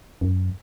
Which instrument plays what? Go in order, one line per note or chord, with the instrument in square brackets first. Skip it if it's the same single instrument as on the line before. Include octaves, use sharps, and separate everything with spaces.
[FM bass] F#2